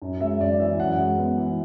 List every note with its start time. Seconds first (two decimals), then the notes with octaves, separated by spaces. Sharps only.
0.02 F#2
0.21 G#3 E5
0.40 F#2 D5
0.60 E3 E5
0.79 F#2 F#5
0.99 G#3
1.18 B3
1.37 E3